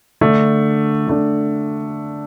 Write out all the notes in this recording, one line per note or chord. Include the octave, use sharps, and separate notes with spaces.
D3 A3 D4
D3 A3 D4